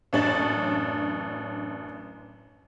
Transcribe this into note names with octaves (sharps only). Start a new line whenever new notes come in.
A1 F#2 D4 C#5 A6 F#7